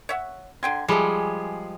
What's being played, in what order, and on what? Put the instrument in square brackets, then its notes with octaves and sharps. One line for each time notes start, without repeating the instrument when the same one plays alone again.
[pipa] C#5 E5 F#5
[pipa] D3 G5 C6 [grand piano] G#6
[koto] F3 G3 G#3 [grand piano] G#4 [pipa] A4 E5